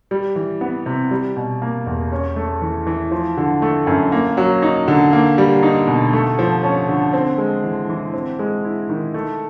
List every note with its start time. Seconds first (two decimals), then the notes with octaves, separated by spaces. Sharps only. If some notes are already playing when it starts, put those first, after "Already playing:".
0.11 G3
0.36 E3
0.61 B3
0.86 C3
1.11 G3
1.36 B2
1.62 A#3
1.87 E2
2.12 C#4
2.36 A3
2.62 E3
2.87 E3
3.11 F3
3.37 D3
3.62 A3
3.87 F#2
4.12 A#3
4.37 F#3
4.62 D#4
4.88 D3
5.13 A#3
5.38 G3
5.63 D#4
5.88 B2
6.13 A3
6.39 F3
6.63 C#4
6.88 D3
7.13 C4
7.38 G#3
7.64 E3
7.89 E3
8.14 C4
8.39 G#3
8.65 E4
8.89 D#3
9.14 A3